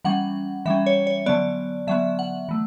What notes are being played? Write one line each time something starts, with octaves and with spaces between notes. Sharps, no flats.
E3 G3 C#4 F#5
E3 G3 C#4 E5
C#5
C#5
D3 F#3 B3 D5
D3 F#3 B3 E5
F#5
E3 A3